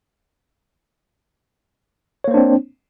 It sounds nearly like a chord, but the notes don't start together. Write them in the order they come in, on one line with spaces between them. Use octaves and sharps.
C#5 A#3 C5 D4 C4